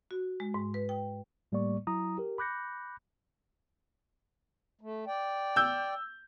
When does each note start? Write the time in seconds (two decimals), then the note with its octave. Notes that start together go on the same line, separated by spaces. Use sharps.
0.11 F#4
0.40 G#3
0.54 G#2
0.74 B4
0.89 G5
1.52 A2 G3 A3 A#3 D5 C#6
1.87 F#3 E4 A#5 D#6
2.18 G4 A#4
2.38 B5 D6 F#6 G6 A#6 C#7
4.81 A3
5.07 D5 G5
5.56 E6 G6